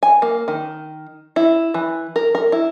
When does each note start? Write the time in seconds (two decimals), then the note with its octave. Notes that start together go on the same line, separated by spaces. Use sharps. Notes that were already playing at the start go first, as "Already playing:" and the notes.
0.03 G#5
0.22 A#3
0.48 D#3
1.36 E4
1.74 E3
2.16 A#4
2.35 A#4
2.52 E4